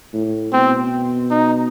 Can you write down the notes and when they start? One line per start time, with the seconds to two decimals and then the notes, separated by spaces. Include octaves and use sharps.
0.13 A2
0.53 B2 C4
1.30 D#4